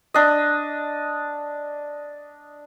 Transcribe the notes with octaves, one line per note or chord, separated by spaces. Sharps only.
D4 D#5